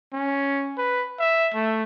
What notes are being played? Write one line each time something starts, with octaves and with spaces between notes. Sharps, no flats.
C#4
B4
E5
A3